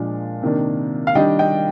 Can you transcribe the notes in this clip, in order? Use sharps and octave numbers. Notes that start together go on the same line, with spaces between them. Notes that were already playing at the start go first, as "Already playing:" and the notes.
Already playing: A#2 F3 G#3 D4
C3 D#3 A#3 D4
F5
D#3 G3 D4 D#5 G5
D#5 G5